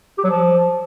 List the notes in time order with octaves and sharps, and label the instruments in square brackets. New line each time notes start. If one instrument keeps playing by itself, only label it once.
[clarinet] G4
F#3
F3